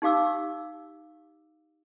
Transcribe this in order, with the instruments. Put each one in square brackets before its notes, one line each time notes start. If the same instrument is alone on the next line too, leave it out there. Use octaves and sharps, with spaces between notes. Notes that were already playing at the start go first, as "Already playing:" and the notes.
[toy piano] D#4 G4 F5 D6 E6